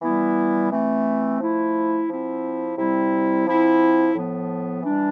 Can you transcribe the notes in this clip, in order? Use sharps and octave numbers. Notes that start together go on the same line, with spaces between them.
E3 G3 B3 E4
E3 A3 C4
F3 A3 E4
F3 C4 E4
C3 G3 C4 E4
F3 C4 E4
A2 F3 B3
E3 G3 D4